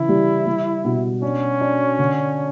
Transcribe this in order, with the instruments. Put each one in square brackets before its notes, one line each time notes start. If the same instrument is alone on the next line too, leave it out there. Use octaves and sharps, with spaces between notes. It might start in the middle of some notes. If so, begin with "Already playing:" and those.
Already playing: [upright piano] C#3 E3 [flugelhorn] E4
[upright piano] G3
G3
B2
[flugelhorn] C#4 [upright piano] D4
[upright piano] D4
D3